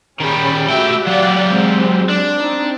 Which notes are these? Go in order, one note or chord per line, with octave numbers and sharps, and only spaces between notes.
D#3 G3 C#4 G#4 B5
A3 F#4 G4 E5 G5
F#3 G4 D5 F5 F#5
G#3 C4
D4
C4 D#4